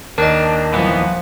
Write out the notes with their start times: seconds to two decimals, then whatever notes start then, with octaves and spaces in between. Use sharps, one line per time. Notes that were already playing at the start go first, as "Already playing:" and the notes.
0.18 D#2 D4 A#4 D#5
0.73 E3 F3 B3